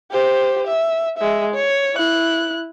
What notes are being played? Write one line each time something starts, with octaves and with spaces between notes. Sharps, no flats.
G4 C5
E5
G#3 E5
C#5
E4 F#6